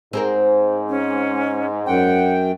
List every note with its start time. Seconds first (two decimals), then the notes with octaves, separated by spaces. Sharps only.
0.13 G#2 C4 G#4 A#4
0.89 C#4
1.87 F#2 F#5 G5